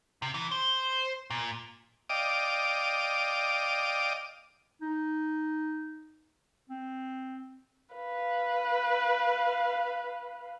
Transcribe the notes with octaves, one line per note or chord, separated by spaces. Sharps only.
C3
E3
C5
A#2
D5 D#5 F5 G5 D6 D#6
D#4
C4
B4 F5